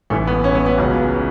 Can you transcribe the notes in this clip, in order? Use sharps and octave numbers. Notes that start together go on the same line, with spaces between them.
A1 A2 E3 A3
B3
C#4
B3
B3
C#2 C#3 F#3